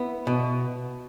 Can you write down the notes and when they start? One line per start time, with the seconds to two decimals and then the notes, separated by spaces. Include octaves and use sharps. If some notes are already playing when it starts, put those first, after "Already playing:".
Already playing: B3 E4
0.27 B2